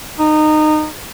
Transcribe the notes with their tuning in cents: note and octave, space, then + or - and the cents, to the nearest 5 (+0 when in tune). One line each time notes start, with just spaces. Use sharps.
D#4 -20